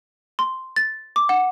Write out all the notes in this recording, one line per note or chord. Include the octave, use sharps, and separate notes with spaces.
C6
A6
D6
F#5